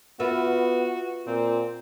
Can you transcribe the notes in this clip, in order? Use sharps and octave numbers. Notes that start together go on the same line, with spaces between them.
B3 F4 F#4 B4 E5
A#2 C4